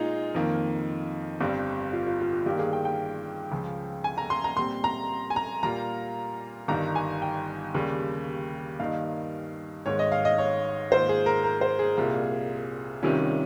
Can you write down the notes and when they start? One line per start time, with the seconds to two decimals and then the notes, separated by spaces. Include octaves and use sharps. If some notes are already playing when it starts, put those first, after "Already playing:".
Already playing: A#2 G#3 D#4 F4 G#4
0.34 F2 D#3 A#3
1.41 G1 G2 G3 C4
1.93 F4
2.07 F4
2.20 F4
2.33 F4
2.46 G2 D#3 A#3 F4 G4
2.59 G#4
2.73 G5
2.85 G5
3.51 C#2 C#3 F3
4.04 G#5
4.18 A#5
4.30 C6
4.44 A#5
4.57 A#2 G3 C4 C6
4.84 A#5
5.30 G#5
5.36 A#5
5.63 A#2 G3 A#3 F4 A#5
6.68 G1 G2 D#3 A#5
6.95 G#5
7.22 G5
7.74 D#2 C#3 G3
8.80 G2 D#3 A#3 D#4 F5
9.86 G#1 G#2 D#3 G#3 C#5
9.99 D#5
10.12 F5
10.25 D#5
10.38 C#5
10.91 G#2 D#3 A#3 F4 C5
11.09 G#4
11.26 A#4
11.44 A#4
11.61 C5
11.79 G#4
11.97 C2 A#2 G3 A#3 F4
13.03 C2 C3 D#3 G3 C#4 F4
13.20 F4